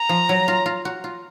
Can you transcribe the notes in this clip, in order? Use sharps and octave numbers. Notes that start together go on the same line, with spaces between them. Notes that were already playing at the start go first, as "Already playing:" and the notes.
Already playing: A#5
F3
F#3
F4
F4
F#4
F4